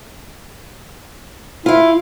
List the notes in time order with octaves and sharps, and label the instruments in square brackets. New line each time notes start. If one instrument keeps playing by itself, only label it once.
[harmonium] E4 [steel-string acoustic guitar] F4 F5